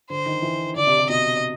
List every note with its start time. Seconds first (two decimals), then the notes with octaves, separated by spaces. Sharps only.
0.10 D3 C5
0.26 D#3
0.42 E3
0.75 D3 D5
0.87 C3
0.98 C3
1.09 B2 D#5